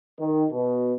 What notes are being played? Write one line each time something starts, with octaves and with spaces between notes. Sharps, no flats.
D#3
B2